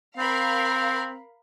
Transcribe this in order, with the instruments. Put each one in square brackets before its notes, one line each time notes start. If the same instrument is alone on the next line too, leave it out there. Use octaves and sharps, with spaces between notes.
[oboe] C4 [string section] A#4 F5 B5